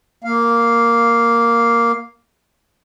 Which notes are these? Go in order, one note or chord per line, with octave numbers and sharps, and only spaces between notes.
A#3 F5